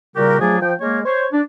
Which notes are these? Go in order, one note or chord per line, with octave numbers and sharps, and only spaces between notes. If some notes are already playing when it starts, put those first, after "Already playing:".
A#2 C#3 G3 F#4 G4 A#4
F3 F#3 A3 D4 G#4
F3 G5
G#3 A#3 C#5
C5 C#5
D4